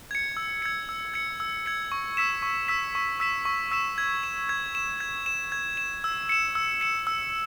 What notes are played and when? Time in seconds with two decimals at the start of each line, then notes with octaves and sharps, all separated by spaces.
0.11 G#6 C#7
0.37 E6
0.62 G#6 C#7
0.89 E6
1.14 G#6 C#7
1.40 E6
1.66 G#6 C#7
1.92 C#6
2.17 E6 B6 E7
2.43 C#6
2.68 E6 B6 E7
2.95 C#6
3.20 E6 B6 E7
3.45 C#6
3.72 E6 B6 E7
3.98 G#6
4.23 E7
4.49 G#6
4.75 E7
5.01 G#6
5.26 E7
5.52 G#6
5.77 E7
6.04 E6
6.29 C#7 E7
6.55 E6
6.81 C#7 E7
7.07 E6